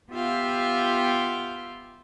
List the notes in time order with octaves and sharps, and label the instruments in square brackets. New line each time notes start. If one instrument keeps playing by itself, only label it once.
[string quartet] B3 F4 G4 E5 F5 G5